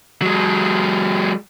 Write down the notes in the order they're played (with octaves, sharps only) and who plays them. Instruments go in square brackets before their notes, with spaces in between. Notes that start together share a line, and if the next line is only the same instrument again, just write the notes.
[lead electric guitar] F#3 G#3